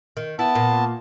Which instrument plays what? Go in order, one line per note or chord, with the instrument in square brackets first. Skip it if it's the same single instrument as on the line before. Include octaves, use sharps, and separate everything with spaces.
[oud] D#3
[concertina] B3 A5 [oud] E4
[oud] A#2